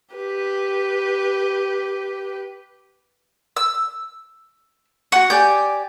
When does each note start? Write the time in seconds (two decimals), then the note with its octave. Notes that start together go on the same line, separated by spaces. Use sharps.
0.15 G4 B4
3.56 E6
5.12 F#4 F#5 C#6
5.30 G4 D5 G#5 G6